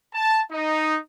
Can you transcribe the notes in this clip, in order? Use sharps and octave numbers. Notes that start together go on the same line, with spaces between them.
A5
D#4